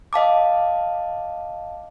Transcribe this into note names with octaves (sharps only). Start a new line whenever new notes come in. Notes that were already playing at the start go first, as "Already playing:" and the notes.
D#5 F5 A5 D6